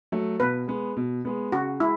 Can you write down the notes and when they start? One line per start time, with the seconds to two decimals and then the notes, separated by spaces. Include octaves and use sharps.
0.12 F#3 A3
0.40 B2 B4
0.68 G#3 B3
0.97 B2
1.25 G#3 B3
1.52 C#3 F#4
1.80 G#3 E4